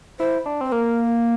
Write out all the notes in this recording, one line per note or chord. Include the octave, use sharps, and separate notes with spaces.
E4 C5
D4
C4 C5
A#3 A#4